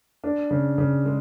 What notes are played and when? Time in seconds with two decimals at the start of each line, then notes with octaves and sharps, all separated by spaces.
0.24 D4
0.51 C#3
0.78 C#3
1.05 G#3